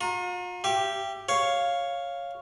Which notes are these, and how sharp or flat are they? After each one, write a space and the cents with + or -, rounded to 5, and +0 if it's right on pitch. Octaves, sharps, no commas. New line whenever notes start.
F4 +45 A#5 +0
G4 +0 E5 +40
C#5 +0 F5 +0